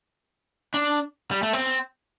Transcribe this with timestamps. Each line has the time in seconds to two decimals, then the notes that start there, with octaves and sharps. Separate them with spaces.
0.74 D4
1.31 G3
1.43 A3
1.53 C4